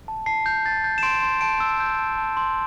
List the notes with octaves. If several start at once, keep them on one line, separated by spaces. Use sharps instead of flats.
A5
A5 C7
G6
G6 A6
G6
E7
C6 D7
C6
A5 D7
E6
G6
A5
A5
C6